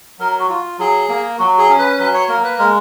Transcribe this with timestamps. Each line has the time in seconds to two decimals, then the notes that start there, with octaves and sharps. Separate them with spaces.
0.19 F#3 A#4
0.40 F#4
0.50 F4
0.79 F#3 G#4
1.09 A#3
1.39 F#3 F#4
1.58 G#4
1.69 C#4
1.79 B4
1.98 F#3 B4
2.14 C#5
2.28 A#3 A#4
2.44 B4
2.59 G#3 A#4